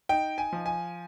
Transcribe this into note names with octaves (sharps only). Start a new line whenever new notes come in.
D#4 G5
G#5
F3
G#5